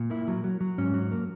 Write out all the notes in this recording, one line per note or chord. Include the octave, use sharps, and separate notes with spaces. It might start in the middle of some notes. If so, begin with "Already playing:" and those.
Already playing: A#2
A#3 E4
F#3
F#3
F#3
G#2 C#4
F#3
A#3